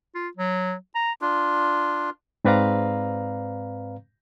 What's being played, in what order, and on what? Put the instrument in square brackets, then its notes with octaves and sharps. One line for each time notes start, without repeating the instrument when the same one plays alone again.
[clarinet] F4
F#3
A#5
[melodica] D4 F4
[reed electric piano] G#2 C4 B4 D5 F5 A#5